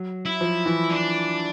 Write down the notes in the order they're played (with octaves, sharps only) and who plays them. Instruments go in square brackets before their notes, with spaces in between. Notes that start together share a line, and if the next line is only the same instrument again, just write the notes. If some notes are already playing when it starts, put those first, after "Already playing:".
Already playing: [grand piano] F#3
[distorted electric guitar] E4
[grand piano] F3
E3
[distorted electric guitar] D4